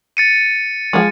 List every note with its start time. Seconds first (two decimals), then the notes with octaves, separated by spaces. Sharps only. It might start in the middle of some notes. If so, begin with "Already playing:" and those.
0.17 A6 C#7 D#7
0.93 F3 G#3